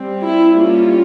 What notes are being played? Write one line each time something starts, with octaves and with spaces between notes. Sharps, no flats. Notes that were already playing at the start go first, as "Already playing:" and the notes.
Already playing: G3 C4
E4
G3 A#3 C#4 F4